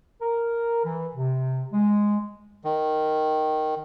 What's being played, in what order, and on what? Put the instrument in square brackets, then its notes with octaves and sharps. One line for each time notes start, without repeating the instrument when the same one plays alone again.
[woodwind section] A#4
E3
C3
G#3
[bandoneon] D#3